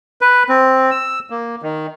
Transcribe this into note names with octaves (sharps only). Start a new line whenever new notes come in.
B4
C4
E6
A#3
D#3